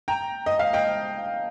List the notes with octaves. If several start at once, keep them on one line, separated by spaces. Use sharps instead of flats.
G5 A#5
D#5
F5
D#5 G5